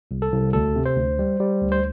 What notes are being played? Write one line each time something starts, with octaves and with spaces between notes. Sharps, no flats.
C2
A4
C2
D2 A4
C3
C5
D2
G3
G3
D2
C5